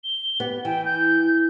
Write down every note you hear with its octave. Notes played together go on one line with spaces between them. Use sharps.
G7
B3 G4
E3 G5
G6